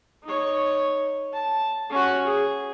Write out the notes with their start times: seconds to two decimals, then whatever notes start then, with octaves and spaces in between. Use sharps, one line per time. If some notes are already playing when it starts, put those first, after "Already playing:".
0.24 D#4 C#5
1.33 A5
1.90 C#4 F#4
2.26 G#4